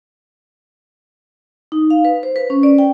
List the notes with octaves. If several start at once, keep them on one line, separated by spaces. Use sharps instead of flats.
D#4
F5
B4
C5
B4
C#4
D5
G5